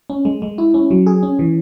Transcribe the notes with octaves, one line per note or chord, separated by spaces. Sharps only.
C#4
G#3
G#3
E4
C#4
F#3
G#4
C#4
E3